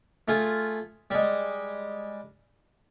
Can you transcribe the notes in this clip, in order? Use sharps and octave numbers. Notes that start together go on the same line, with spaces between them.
A3 F4 G#4
G3 G#3